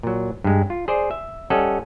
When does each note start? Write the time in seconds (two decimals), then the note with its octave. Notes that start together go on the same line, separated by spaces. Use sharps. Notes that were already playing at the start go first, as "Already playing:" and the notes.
0.03 A#2 F#3
0.44 G2 G#3
0.70 F4
0.88 G#4 C5 D5
1.11 E5
1.50 G3 C#4 A4 D#5 F#5